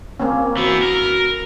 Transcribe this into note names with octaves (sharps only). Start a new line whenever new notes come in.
A#3 C4 C#4
E3 B3 F#4
A#4